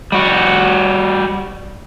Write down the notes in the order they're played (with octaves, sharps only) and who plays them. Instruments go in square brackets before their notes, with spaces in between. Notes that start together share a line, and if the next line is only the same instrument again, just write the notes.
[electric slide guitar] G3 F#4